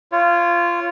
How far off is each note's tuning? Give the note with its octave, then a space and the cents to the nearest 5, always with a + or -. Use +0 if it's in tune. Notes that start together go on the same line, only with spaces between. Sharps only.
F4 -15 C#5 +0